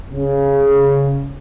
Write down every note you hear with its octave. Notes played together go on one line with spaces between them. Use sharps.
C#3